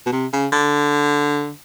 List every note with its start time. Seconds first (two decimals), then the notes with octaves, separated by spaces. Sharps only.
0.06 B2
0.12 C3
0.33 C#3
0.52 D3